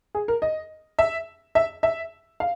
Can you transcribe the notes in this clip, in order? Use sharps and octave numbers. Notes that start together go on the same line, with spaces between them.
G#4
A#4
D#5
E5
E5
E5
F5